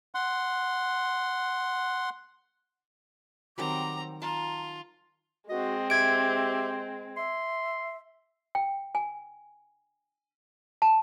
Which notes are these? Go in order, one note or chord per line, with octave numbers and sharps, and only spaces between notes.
F#5 C6
D#3 F#3 G3 C4 A#5 D6
F4 A5 A#5
G#3 C4 F#4 D#5
G4 E5 G#6 D7
E5 C6
G5
G#5
A5